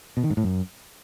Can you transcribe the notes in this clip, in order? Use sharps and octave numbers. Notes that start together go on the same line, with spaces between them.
B2
D#3
G#2
A2
F#2